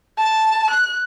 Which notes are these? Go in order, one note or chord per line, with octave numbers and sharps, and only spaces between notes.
A5
F#6